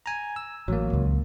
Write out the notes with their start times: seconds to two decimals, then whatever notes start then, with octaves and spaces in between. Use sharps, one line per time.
0.06 G#5 A#5
0.36 E6
0.68 A1 F#3 A#3
0.93 C#2